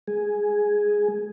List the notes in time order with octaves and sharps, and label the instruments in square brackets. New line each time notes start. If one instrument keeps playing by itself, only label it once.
[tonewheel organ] G#3 G#4